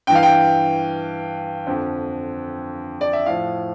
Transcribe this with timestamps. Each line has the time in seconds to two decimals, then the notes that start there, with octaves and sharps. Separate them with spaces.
0.07 G2 E3 G5
0.15 F5
0.23 G5
1.67 F2 D3 F3
3.01 D5
3.13 E5
3.26 A2 F3 F5